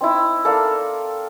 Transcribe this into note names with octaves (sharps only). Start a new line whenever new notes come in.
C4 D#4 E4
A4 A#4 D5 F5